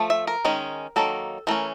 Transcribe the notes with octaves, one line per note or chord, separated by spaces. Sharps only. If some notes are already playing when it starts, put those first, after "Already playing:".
Already playing: F3 A3
E5
A#4
D#3 G#3 C#4
D#3 F#3 A#3 A4
E3 A3 C#4 A#4